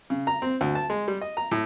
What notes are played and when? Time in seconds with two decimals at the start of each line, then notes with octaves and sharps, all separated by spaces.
0.10 C#3
0.27 A#5
0.42 C4
0.61 D2
0.75 A5
0.90 G#3
1.08 G3
1.21 D#5
1.37 A#5
1.52 A2